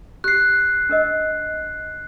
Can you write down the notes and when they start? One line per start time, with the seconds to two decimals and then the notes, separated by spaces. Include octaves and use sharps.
0.24 G4 F#6 C7
0.89 D4 A#4 D#5